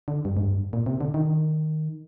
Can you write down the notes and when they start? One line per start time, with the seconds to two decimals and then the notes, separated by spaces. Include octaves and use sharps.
0.08 D3
0.25 G2
0.37 G#2
0.42 G2
0.73 A#2
0.86 C3
1.01 D3
1.14 D#3